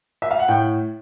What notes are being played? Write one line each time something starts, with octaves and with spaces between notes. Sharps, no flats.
E5
F5
F#5
A2 G5